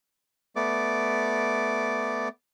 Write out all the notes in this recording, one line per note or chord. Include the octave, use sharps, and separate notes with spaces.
A3 B3 D5 D6